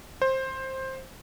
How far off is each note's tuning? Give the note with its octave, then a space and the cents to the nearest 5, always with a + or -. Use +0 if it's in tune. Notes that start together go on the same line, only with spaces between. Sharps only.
C5 +15